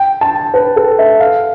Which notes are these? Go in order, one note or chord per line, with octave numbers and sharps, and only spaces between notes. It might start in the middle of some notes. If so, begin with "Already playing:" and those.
Already playing: G5
A5
B4
A4
E5
F5